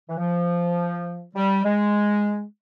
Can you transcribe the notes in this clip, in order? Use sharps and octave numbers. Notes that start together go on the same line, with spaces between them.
E3
F3
G3
G#3